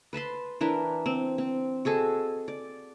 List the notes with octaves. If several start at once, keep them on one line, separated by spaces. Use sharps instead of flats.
B4 A5 B5 C6
E3 D4 A#4 B4
C4
C4
F#4 G#4 A4 D#5
D5